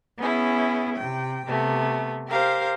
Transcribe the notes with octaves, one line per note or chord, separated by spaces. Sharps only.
B3 C#4 E4 G#4
C3 G5
C3 A3 B3
G4 A#4 C5 F5